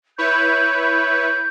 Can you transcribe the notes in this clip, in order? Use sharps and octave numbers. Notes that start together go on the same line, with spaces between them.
E4 B4 C#5 G6